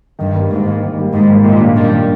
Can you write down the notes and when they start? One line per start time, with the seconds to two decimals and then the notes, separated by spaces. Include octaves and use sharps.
0.19 G2 D#3
0.36 G3 A#3
0.51 G#2 D#3
0.67 G3 A#3
0.83 D#3
0.98 G3 A#3
1.13 G#2 D#3
1.29 G3 A#3
1.45 A#2 D#3
1.61 A#3 D4
1.76 G2 D#3 G3
1.93 A#3 D4